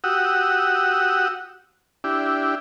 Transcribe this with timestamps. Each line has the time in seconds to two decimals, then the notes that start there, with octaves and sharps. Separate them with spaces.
0.04 F#4 G4 F#5 D#6 E6
2.04 D4 E4 G4